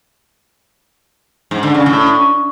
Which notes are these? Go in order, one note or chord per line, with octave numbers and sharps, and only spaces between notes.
G#2
D3
C#3
A2